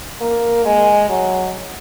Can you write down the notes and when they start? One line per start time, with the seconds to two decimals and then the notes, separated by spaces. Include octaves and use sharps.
0.20 A#3
0.65 G#3
1.09 F#3